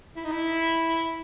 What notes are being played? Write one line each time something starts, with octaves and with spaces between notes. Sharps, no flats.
E4
D#4
E4